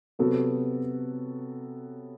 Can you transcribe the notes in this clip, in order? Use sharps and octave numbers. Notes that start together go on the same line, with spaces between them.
C3 F#3 B3 F#4 A4